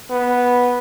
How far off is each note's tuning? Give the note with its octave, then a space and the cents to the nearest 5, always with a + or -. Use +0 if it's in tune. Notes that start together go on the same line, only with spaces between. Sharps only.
B3 -5